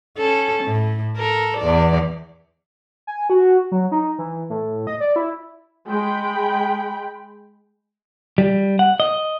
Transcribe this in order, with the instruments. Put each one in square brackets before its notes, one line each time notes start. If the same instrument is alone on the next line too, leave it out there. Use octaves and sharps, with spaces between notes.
[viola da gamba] C#4 A4
A2
A4 A#4
E2 D5
[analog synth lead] G#5
F#4
F#3
D#4
E3
A2
D#5
D5
E4
[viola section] G#3 G5 B5
[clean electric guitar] G3
F#5
D#5